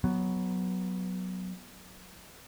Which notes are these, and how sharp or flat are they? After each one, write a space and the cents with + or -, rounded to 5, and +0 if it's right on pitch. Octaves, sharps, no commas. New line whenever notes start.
F#3 +0 B3 +0